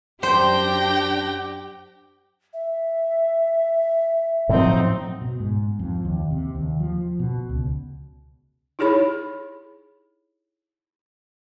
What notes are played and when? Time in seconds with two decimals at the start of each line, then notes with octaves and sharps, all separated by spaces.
0.23 F#2 D4 G4 C5 G5 A#6
2.53 E5
4.49 A2 F3 F#3 C4 D#4
5.21 B2
5.40 G#2
5.79 F2
6.05 D#2
6.31 C3
6.55 D#2
6.79 F3
7.20 B2
7.49 C#2
8.79 D#4 E4 G4 G#4 C#5 B5